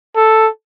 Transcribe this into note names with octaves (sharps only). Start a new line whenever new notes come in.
A4